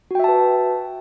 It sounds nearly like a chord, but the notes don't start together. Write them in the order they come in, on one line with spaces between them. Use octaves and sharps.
F#4 G5 E5 A5 B4